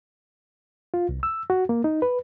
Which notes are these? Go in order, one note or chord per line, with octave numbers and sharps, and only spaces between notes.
F4
C2
E6
F#4
A#3
D#4
B4